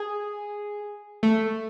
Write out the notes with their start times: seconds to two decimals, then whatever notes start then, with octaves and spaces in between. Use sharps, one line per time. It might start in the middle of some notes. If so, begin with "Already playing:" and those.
Already playing: G#4
1.23 A3